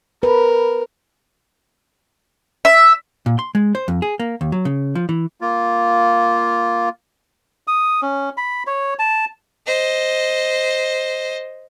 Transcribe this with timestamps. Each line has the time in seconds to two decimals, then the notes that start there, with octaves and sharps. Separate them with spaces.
0.23 A#4 B4
2.65 E5
3.26 A#2
3.39 C6
3.55 G#3
3.75 C5
3.88 F2
4.02 G#4
4.20 A#3
4.41 D#2
4.52 F#3
4.65 C#3
4.95 F3
5.09 E3
5.41 A#3 F4
7.68 D#6
8.02 C#4
8.37 B5
8.67 C#5
8.99 A5
9.67 C5 D#5